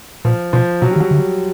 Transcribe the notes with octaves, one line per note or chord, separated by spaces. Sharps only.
A#2 F3
B2 F3
B2 F#3
G3
D#3
F#3
D3